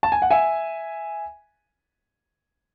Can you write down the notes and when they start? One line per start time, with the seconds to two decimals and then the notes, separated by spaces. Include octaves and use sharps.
0.03 A5
0.12 G#5
0.22 F#5
0.31 E5 G#5